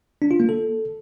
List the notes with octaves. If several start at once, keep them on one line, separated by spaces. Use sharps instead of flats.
D4
F4
A#3
A4